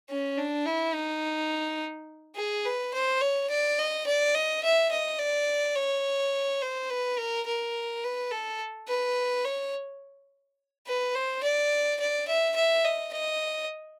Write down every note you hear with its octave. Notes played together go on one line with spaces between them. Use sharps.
C#4
D4
E4
D#4
G#4
B4
C5
C#5
D5
D#5
D5
D#5
E5
D#5
D5
C#5
C5
B4
A#4
A#4
B4
A4
B4
C#5
B4
C5
D5
D5
E5
E5
D#5
D#5